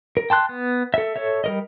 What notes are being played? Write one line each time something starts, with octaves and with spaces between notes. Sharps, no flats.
A#4
G5 A5 C6 F#6
B3
A4 E5
A4 C#5 E5
G3 A#4 D#5